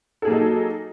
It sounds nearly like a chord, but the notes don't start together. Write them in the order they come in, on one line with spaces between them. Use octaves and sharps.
A4 G#4 A#3 F#3 D#4